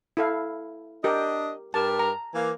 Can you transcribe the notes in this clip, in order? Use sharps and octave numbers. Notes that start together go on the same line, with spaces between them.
E4 A4 F5
D4 G4 A#4 D#5
G2 G4 A#4 A5
A#5
E3 A#3